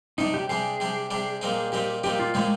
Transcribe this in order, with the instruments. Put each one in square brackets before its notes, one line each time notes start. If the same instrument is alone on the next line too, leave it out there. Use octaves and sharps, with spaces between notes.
[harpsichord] C3 G3 D4 [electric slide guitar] D#4
[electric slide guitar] G4
[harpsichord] C3 G3 D4 [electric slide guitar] G#4
[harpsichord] C3 G3 D4
C3 G3 D4
A#2 G3 C4 D#4
[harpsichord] A#2 G3 C4 D#4 [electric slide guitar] G4
[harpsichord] A#2 G3 C4 D#4 [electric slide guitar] G4
[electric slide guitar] F4
[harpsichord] A#2 G3 C4 D#4 [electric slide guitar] G#3